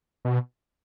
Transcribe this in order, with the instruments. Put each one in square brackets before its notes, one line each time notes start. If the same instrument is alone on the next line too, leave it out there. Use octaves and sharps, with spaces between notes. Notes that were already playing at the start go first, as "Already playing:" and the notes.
[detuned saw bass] B2